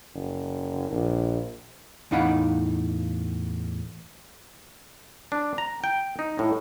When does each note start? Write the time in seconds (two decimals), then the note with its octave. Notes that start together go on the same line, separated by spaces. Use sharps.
0.14 F#1
0.90 A#1
2.11 E2 A2 D#4 F5 F#5 B5
5.32 D4
5.58 A#5
5.84 G5
6.19 D#4
6.39 A2